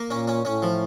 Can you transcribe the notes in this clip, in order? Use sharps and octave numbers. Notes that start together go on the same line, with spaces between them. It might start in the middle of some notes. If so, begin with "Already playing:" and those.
Already playing: A#3
A#2 C#4
C#4
A2 C#4
F3